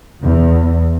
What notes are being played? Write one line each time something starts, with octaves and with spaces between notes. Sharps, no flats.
E2